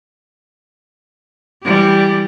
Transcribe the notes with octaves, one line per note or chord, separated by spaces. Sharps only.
E3 G3 G4